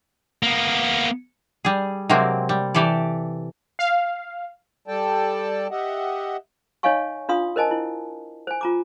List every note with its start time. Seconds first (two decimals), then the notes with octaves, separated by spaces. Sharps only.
0.43 A#3 B3
1.65 G3 G#4
2.10 C3 F#3 G#3 A#3 C4
2.49 G3
2.75 E3 G4 A4 D5
3.79 F5
4.88 G3 A4 D5 G5 A5
5.71 G4 D#5 E5 F#5
6.83 D#4 C#5 D#5 F5 G#5 C#6
7.29 D4 F4 F5 C6 D#6
7.56 A#4 C5 D#5 G#5 A5
7.71 E4
8.47 C5 G#5
8.61 F4 A#5 D6